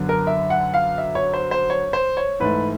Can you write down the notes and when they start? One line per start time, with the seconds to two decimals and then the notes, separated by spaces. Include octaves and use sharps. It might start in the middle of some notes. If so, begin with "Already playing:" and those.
Already playing: F#2 D3 F#3 B3
0.09 A#4
0.27 E5
0.50 F#5
0.74 F5
0.98 E5
1.15 C#5
1.34 C5
1.51 C5
1.70 C#5
1.93 C5
2.17 C#5
2.40 G#2 E3 A3 B4